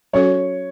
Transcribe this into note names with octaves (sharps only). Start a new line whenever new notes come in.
F#3 C#4 F#4 A4 C#5